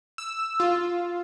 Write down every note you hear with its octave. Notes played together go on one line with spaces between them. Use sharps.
E6
F4